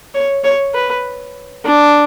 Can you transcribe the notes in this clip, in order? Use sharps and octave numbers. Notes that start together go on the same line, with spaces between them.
C#5
C#5
B4
D4